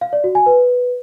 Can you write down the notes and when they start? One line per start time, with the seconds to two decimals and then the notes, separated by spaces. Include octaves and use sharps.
0.01 F5
0.13 D5
0.24 F#4
0.35 G#5
0.46 B4